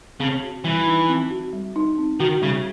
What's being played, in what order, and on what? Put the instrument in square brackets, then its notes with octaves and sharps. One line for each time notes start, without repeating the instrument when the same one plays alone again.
[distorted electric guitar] C#3 [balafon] C4
[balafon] F#4
[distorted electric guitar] E3 [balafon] G3
[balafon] D#4
C4
F#4
G3
D#4
C4
[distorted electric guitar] D#3 [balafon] F#4
[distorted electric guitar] C#3 [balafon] G3